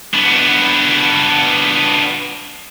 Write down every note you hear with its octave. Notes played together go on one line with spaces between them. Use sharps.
B3 D4